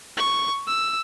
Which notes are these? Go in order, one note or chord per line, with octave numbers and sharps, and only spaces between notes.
C#6
E6